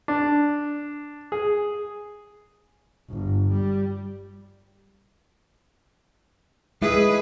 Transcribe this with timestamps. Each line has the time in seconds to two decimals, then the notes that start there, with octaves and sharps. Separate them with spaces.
0.08 D4
1.32 G#4
3.10 G1
3.53 G3
6.82 G#3 E4 G#4 B4 E5